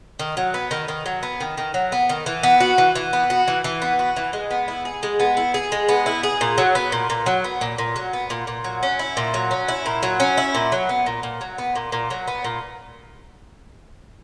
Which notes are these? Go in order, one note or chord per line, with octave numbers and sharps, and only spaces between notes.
D#3
F#3
B3
D#3
D#3
F#3
B3
D#3
D#3
F#3
B3
D#3
E3
B3
F#4
E3
E3
B3
F#4
E3
E3
B3
F#4
E3
G#3
B3
E4
G#4
G#3
B3
E4
G#4
G#3
B3
E4
G#4
A#2
F#3
B3
A#2
A#2
F#3
B3
A#2
A#2
F#3
B3
A#2
A#2
F#3
C#4
E4
A#2
F#3
C#4
E4
A#2
F#3
C#4
E4
A#2
F#3
B3
A#2
A#2
F#3
B3
A#2
A#2
F#3
B3
A#2